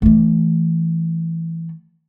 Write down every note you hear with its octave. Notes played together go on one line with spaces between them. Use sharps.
E3 A3